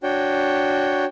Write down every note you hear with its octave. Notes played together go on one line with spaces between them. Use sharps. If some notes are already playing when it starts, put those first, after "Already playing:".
D4 F#4 C#5 G5